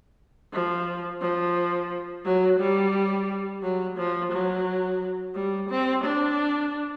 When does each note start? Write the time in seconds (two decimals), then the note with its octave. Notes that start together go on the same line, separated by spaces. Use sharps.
0.53 F3
1.22 F3
2.25 F#3
2.60 G3
3.62 F#3
3.98 F3
4.32 F#3
5.35 G3
5.69 C4
6.04 D4